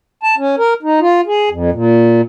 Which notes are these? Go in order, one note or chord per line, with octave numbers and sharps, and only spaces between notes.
A5
C#4
A#4
D#4
F4
G#4
F2
A#2